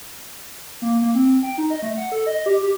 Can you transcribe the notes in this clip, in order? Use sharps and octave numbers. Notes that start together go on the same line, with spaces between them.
A#3
A#3
C4
G5
D#4
D#5
A3
F#5
A4
D#5
G4
G4